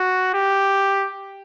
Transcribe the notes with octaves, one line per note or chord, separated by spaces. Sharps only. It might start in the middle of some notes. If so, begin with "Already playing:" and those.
Already playing: F#4
G4